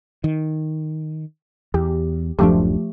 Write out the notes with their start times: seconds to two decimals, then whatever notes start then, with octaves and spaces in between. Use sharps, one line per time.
0.24 D#3
1.74 E2 G4
2.39 D1 F#2 F3 A3 D4 G4